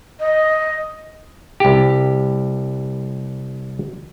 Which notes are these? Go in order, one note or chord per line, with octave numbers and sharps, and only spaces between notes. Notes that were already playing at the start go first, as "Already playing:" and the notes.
D#5
C2 G4